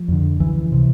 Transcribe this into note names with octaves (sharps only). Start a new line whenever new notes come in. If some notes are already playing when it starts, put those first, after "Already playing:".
Already playing: F3
F2 D3
C#2 E3
C3